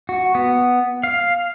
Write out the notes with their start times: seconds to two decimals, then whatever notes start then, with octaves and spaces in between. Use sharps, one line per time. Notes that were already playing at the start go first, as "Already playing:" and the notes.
0.09 F#4
0.35 B3
1.03 F5